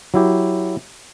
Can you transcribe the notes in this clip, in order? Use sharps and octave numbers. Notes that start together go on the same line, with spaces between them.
F#3 E4 G4